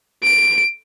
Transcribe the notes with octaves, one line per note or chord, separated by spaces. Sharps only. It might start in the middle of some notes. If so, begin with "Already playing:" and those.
D7